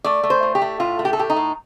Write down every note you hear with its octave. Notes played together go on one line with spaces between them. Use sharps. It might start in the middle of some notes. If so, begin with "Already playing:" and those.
A3 D5
A3
C5
A2
G4
A3
A2 F4
A3
G4
A4
A2 G4
D#4
A2